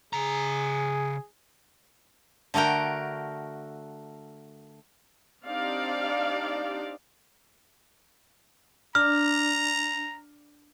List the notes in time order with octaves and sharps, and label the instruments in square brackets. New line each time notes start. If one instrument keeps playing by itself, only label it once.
[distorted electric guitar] C#3 A#5 [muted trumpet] G#4
[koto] D3 A3 F#4 A#4 G5
[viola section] C4 D4 D#4 G4 D5 F5
[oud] D4 [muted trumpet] A#5 [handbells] F6